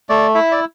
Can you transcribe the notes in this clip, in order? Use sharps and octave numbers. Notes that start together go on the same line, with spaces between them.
A3 D5
E4 E5
D5